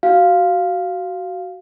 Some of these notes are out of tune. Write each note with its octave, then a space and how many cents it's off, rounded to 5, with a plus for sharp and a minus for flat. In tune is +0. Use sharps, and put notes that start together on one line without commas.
F#4 +15 F5 +0